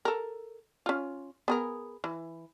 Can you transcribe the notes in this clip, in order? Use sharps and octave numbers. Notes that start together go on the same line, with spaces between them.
A4 A#4
C#4 F4
B3 G#4 A#4
E3